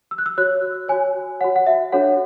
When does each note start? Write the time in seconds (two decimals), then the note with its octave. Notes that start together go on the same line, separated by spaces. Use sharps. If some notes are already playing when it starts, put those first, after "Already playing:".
0.11 E6
0.18 F#6
0.26 E6
0.38 F#4 C#5 F#6
0.88 F#4 C#5 G#5
1.41 F#4 C#5 F#5
1.56 F#5
1.66 E5
1.92 D4 F#4 A4 C#5 F#5